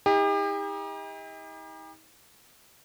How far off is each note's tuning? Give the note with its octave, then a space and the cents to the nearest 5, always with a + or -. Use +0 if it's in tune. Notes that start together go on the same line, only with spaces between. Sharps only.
D#4 +40 G4 +40